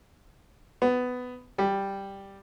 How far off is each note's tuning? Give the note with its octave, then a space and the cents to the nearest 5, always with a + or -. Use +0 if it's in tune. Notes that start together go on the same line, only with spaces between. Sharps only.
B3 +15
G3 +0